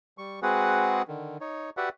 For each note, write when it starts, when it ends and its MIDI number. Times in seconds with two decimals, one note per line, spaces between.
0.18 0.40 55
0.18 0.40 85
0.42 1.02 56
0.42 1.02 60
0.42 1.02 66
0.42 1.02 68
0.42 1.02 71
0.42 1.02 78
1.08 1.38 50
1.08 1.38 51
1.41 1.70 63
1.41 1.70 73
1.77 1.89 66
1.77 1.89 67
1.77 1.89 71
1.77 1.89 74
1.77 1.89 76
1.77 1.89 78